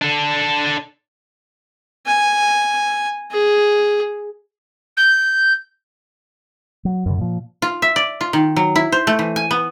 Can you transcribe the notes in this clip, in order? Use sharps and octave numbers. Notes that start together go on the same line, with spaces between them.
D4 A4
G#5
G#4
G6
F#3
F#2 C#3
A#2 F3
F4
E5
D5
F4
D#3
F#3
E4
C5
A3
E3
G#5
B3